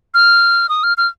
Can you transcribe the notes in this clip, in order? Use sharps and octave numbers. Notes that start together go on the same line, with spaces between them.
F6
D#6
F6
F6